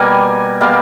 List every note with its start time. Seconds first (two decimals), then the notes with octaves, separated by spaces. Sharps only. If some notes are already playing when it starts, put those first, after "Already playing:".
Already playing: B2 G3 A#3 G#5
0.61 B2 G3 A#3 F5